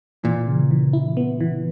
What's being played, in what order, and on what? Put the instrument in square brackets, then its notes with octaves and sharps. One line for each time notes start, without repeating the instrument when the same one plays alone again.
[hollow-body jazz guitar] A#2 [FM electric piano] E3
[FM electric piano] C#3
E3
E4
B3
E3